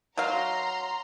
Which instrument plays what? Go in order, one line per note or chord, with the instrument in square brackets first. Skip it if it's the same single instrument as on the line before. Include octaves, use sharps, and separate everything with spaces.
[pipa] F#3 F5 [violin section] A#5 C6